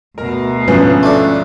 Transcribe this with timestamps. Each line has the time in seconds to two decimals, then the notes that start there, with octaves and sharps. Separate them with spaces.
0.18 D2 B2 A#4 A#5
0.68 G#2 D3 F3 C#4 B4
1.03 A3 D4